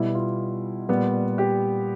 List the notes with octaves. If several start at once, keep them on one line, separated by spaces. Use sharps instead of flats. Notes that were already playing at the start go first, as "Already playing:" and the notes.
Already playing: B2 G3 B3 E4
F4
A#2 G3 B3
G4